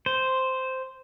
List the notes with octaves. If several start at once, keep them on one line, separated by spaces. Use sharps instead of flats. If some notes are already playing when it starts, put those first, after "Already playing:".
C5